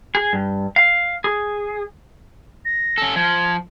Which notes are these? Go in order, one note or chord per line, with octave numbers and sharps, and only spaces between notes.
G#4
G2
F5
G#4
A#6
C#4 A4
F3 G#6